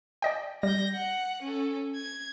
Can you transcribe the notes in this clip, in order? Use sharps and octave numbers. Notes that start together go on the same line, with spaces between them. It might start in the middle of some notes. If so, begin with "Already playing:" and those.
D5 D#5 G5
G3 G6 A#6
F#5
C#4 A4
G#6